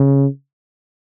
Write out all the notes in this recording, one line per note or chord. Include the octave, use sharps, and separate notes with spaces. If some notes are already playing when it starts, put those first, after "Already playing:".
Already playing: C#3